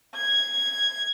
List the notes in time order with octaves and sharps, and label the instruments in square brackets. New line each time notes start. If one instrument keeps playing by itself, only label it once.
[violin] G#6